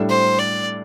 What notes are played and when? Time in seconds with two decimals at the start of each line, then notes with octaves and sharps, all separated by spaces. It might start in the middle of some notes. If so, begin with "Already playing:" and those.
Already playing: A2 G3 D4 A4
0.10 C5
0.39 D5